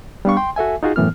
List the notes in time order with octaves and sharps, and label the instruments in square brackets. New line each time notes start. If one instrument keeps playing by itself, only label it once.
[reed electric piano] G3 B3 D4 F5 C#6
G5 C6
F#4 A4 E5 G#5
D#4 F4 F#4 G#4
F#2 A2 E3 B3 F6